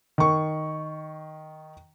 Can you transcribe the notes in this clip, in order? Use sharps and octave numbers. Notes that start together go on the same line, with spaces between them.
D#3 C#6